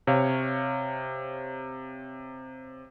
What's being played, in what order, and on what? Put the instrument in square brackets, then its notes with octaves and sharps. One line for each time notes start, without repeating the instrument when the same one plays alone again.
[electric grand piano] C3 C#5 F5